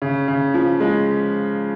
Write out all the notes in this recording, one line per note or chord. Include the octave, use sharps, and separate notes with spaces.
C#3
C#3
F3
G#3